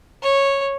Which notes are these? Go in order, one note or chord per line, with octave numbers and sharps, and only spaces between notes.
C#5